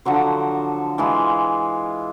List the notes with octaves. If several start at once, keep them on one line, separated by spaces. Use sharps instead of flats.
D3 F3 F#3 C5
E3 G#3 F4